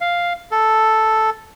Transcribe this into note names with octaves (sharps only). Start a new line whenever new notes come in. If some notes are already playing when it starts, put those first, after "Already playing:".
F5
A4